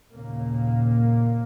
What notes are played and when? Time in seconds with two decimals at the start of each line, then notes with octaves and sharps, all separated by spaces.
0.12 D#2 A#2 C#3 A#3